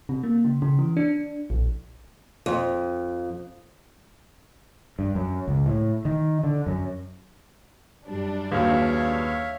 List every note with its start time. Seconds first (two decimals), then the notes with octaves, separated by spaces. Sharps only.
0.09 C3
0.23 A#3
0.45 C#3
0.62 C#3
0.79 E3
0.97 D4
1.50 A#1
2.46 F2
4.99 G2
5.15 F#2
5.48 C#2
5.66 A2
6.05 D#3
6.43 D3
6.66 F#2
8.06 F#2 G3 D4
8.52 D#2 F#4 G#4 B4 C#5 E5 F5